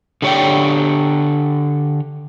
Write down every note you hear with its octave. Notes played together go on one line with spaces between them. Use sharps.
D3 G4 C#5 D5 G5